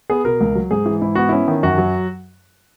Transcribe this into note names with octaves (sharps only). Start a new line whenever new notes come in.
B3 G#4
B2 A#4
C#2
F#3
G#2 G#4
E3
G#2 E4
B3 F#4
C#4 E4
D#3
F#2 F#4
F#3